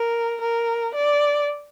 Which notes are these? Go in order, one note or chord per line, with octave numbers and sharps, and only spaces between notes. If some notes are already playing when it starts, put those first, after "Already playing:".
Already playing: A#4
A#4
D5